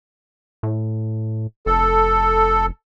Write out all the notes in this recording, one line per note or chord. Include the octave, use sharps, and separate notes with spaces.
A2
F1 A4